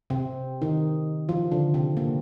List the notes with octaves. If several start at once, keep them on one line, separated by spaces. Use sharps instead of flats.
C3 C4
D#3 D#4
F3 F4
D3 D4
C3 C4
A#2 A#3